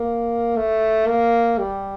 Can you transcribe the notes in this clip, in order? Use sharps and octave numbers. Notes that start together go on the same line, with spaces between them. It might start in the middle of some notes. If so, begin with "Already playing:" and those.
Already playing: A#3
A3
A#3
G3